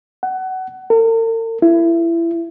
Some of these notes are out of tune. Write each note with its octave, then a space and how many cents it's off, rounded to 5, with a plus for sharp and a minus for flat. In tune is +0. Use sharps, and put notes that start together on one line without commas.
F#5 +25
A#4 -45
E4 +25